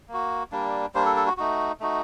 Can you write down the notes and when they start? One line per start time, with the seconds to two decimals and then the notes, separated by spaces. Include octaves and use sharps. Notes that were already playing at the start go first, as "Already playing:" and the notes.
0.09 A#3 F#4
0.52 G3 A#3 D4
0.94 G3 A#3 D4 C5
1.06 A4
1.16 A4
1.27 F#4
1.37 A3 D#4 F#4
1.80 A3 D#4 F#4